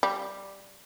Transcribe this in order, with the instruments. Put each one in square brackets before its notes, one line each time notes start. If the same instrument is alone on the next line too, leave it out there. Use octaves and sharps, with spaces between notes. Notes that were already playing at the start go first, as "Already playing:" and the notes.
[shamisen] G3